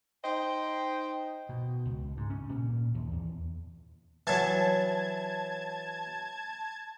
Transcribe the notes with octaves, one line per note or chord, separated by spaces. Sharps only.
D#4 C5 D#5 G5
B2
C#2
G#2
C#4
A#2
D#2
E2
E3 F#3 A5 G#6